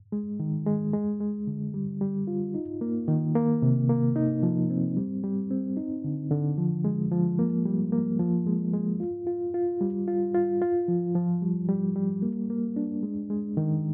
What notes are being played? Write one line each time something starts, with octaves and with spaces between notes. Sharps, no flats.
G#3
D#3
G#3
G#3
G#3
D3
G3
G3
F4
D#4
A#3
D#3
A#3
C3
A#3
D#4
F3
C4
G3
G3
C4
D#4
D3
D3
F3
G#3
F3
A#3
G3
A#3
F3
G#3
G#3
F4
F4
F4
G3
F4
F4
F4
F3
F3
G3
G3
G3
A#3
A#3
D4
G#3
G#3
D#3